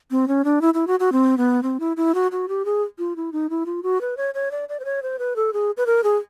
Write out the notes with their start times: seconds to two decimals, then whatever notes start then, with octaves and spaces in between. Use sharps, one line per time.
0.11 C4
0.28 C#4
0.44 D4
0.61 E4
0.74 E4
0.87 F#4
1.00 F#4
1.12 C4
1.38 B3
1.63 C4
1.80 E4
1.97 E4
2.14 F#4
2.32 F#4
2.49 G4
2.65 G#4
2.99 F4
3.16 E4
3.32 D#4
3.50 E4
3.66 F4
3.83 F#4
4.01 B4
4.17 C#5
4.34 C#5
4.51 D5
4.69 D5
4.80 C5
4.85 C#5
5.03 C5
5.19 B4
5.36 A4
5.53 G#4
5.77 B4
5.86 A#4
6.04 G#4